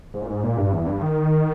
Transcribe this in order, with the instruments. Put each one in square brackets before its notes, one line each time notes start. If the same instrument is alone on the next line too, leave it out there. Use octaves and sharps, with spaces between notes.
[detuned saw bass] G#2
A#2
G#2
A#2
G2
E2
G2
D#3